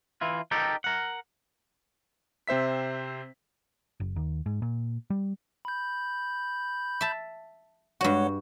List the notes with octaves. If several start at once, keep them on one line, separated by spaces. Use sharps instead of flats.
E3 E4 F4
D#4 G4 A4 A#4 G5
A#4 F#5
C3 C4 C5 E5 B6
F#1
D#2
G#2
A#2
G3
B5 G6
E5 A5
G2 G#3 F#4 C#5 F#5